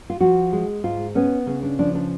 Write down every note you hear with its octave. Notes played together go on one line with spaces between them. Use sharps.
F4
F3 F#4
G#3
G#2 F4
B3 C#4
C#3 C#4
D4
F3 D4
D4